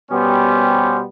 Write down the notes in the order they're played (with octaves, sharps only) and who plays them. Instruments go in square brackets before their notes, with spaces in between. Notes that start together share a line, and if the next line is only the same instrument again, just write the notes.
[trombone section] B2 G3 B3 [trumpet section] C#4 G4 C5